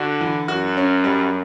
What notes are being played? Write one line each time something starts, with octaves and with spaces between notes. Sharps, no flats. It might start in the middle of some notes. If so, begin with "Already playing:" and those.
Already playing: D3 F#4
E3
F#2 F#4
C#4
G3